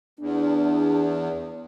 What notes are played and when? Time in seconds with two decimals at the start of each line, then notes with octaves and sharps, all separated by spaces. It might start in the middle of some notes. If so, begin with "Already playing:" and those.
0.19 E2 D4